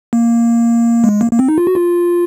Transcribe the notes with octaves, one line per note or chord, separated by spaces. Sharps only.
A#3
G#3
A#3
A#3
C4
D#4
F4
F#4
F4